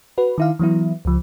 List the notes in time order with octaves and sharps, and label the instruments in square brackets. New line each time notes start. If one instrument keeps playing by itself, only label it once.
[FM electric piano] F#4 B4
D#3 E4 F5
E3 F#3 B3 E4
C#2 F3